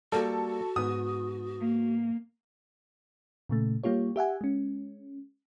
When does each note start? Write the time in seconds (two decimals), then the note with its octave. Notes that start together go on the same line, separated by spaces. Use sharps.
0.12 G3 A#3 F#4 A4
0.76 G#2 B3 D#6
1.59 A#3
3.49 A#2 C#3 A3
3.84 G3 A#3 F4 G4 C#5
4.16 G4 E5 F#5 G#5
4.41 G#3 C#4